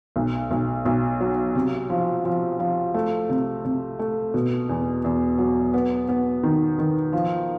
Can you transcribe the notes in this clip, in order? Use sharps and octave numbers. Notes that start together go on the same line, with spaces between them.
B1
B1
B1
F#3
C3
F3
F3
F3
A3
C3
C3
A3
B2
E2
E2
F#3
B3
B3
D#3
D#3
F3